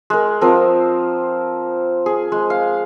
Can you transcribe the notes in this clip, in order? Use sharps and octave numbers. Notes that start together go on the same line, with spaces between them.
G#3 A#4
F3 C4 A#4 D#6
G#4
G#3
F5